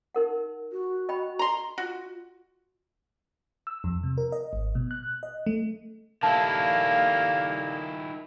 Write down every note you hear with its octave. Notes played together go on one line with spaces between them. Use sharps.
D#4 A#4 F#5
F#4
D#5 G5 B5
A#5 C6
F4 F#4
E6
F2
C3
A#4
D#5
G#1
B2
F#6
D#5
A3
D#3 G3 A3 A#3 E4 F5 A5